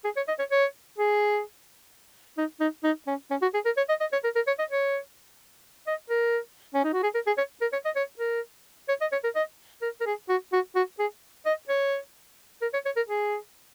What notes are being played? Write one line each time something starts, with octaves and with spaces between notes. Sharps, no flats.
G#4
C#5
D#5
C#5
C#5
G#4
D#4
D#4
D#4
C#4
C#4
F#4
G#4
A#4
C#5
D#5
D#5
C#5
A#4
A#4
C#5
D#5
C#5
D#5
A#4
C#4
D#4
F#4
G#4
A#4
G#4
C#5
A#4
C#5
D#5
C#5
A#4
C#5
D#5
C#5
A#4
D#5
A#4
A#4
G#4
F#4
F#4
F#4
G#4
D#5
C#5
A#4
C#5
C#5
A#4
G#4